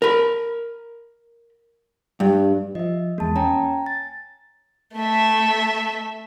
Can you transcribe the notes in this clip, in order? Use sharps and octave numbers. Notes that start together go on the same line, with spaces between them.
A#4 B5
G2
F3 D#5 E5
E2 G#3 A#3 A5
C#4 G5 G#5 A#5
A6
A3 E5